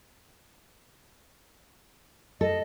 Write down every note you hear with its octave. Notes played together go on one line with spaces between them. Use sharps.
A4 D#5